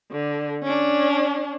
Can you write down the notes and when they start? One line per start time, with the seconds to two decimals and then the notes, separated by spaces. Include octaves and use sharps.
0.11 D3
0.63 C#4 D4